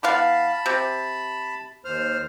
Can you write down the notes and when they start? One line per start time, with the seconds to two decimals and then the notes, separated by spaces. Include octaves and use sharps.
0.03 E3 B3 F5 A5 B5
0.66 C3
1.85 D#2 C5 F6